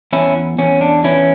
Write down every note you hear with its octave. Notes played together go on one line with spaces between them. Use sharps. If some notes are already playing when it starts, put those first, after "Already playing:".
E2 C#4 E4
E2 C#4
D4
E3 C#4 E4